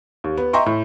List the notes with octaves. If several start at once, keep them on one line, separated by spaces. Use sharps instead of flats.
D#2
B3
D#5 E5 G5 A#5 C6 C#6
A2